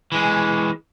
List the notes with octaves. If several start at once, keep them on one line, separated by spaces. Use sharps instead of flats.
E3 G#3